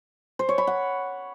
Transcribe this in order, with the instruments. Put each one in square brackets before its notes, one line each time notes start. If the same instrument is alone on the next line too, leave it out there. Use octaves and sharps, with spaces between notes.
[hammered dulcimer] C5
C#5
B5
F#5